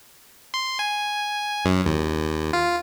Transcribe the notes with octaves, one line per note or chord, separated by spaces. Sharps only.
C6
G#5
F#2
D#2
F4